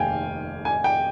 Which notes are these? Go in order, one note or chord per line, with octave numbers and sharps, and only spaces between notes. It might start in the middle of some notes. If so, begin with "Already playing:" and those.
Already playing: F1 D#2 D#3 F5 G5 G#5
G#5
G5